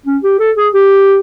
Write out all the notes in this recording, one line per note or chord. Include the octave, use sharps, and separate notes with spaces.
C#4
G4
A4
G#4
G4